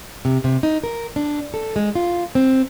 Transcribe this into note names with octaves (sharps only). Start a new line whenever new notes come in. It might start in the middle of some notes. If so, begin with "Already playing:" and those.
C3
C3
D#4
A#4
D4
A4
G#3
F4
C4